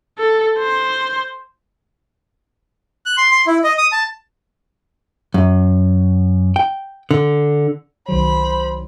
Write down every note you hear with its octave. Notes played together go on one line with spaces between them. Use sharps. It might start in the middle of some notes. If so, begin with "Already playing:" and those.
A4
C5
F#6
C6
C6
E4
D#5
D#6
A5
F#2
G5
D3
C2 D#3 F#3 C5 B5